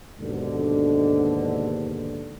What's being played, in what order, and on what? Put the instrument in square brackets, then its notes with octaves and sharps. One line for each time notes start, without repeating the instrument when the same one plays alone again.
[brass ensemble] D#2 G#2 B2 D3